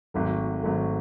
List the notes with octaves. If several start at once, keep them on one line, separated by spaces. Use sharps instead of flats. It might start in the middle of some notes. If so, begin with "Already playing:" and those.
G#1 G#2 F#3 A3
G#1 G#2 F#3 A3